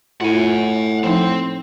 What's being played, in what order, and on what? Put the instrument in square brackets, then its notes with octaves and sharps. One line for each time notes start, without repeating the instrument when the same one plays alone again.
[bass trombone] A2 [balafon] E4 F4 [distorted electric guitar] F#5 G#5
[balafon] F3 D#4 [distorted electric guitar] C4